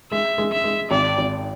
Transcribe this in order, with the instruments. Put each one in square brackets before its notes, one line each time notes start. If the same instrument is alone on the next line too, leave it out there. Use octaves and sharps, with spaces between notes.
[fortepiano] G#3 [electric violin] E5
[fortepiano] G#3
[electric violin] E5
[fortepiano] G#3
[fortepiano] G#1 [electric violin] D5
[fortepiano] G#1